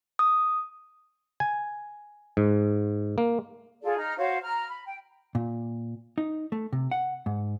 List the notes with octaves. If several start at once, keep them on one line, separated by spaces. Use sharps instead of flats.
D#6
G#5
G#2
A#3
F4 G#4 A4 D5
D#4 A#5 F6
F#4 C5 C#5 F5
A#5 F6
B5
G5
A#2
D#4
A3
C3
F#5
G#2